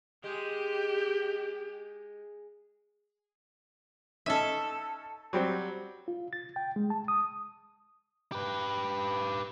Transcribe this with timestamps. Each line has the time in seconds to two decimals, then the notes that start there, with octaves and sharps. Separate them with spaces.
0.24 G#3 G4
4.26 C#4 D#4 A4 E5
5.33 F#3 G3 C4
6.08 F4
6.33 A6
6.56 G5
6.76 G#3
6.90 A5
7.08 D#6
8.32 G4 B4